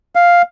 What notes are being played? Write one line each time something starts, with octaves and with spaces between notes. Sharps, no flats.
F5